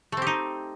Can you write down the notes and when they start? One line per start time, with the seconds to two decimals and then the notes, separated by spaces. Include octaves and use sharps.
0.12 A3
0.17 C4
0.22 G4
0.27 D#4